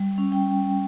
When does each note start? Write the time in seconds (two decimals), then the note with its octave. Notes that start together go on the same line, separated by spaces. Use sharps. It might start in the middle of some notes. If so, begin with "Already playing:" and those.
Already playing: G3
0.18 C#4
0.32 G5